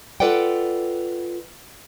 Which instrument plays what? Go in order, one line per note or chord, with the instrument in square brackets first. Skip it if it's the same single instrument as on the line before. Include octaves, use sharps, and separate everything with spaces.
[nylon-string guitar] F4 A4 B4 D5 F#5 G5